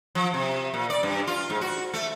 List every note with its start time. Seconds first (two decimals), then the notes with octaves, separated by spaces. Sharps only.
0.15 F3
0.34 C3
0.74 A#2
0.90 D5
1.03 G2
1.27 F4
1.50 G#2
1.61 F#4
1.94 A3